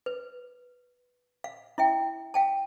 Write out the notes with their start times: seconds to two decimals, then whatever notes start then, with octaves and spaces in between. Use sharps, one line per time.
0.06 B4
1.44 F5
1.78 E4 E5 G5
2.34 F5 G5 A5